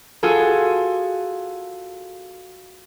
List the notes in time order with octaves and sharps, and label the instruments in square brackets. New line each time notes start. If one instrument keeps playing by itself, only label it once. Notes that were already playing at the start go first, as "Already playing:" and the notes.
[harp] F4 F#4 G#4 A4